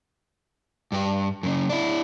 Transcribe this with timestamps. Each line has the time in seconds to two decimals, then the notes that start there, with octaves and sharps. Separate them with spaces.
0.92 G2 G4
1.43 F#2 C#3
1.69 D4 E4